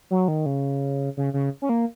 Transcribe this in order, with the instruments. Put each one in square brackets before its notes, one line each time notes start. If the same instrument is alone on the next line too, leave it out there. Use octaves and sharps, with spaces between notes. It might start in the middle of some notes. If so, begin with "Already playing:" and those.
[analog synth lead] F#3
D#3
C#3
C#3
C#3
C#4
A#3